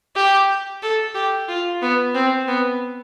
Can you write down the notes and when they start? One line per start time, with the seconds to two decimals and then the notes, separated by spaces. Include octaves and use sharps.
0.16 G4
0.83 A4
1.15 G4
1.49 F4
1.82 B3
2.15 C4
2.48 B3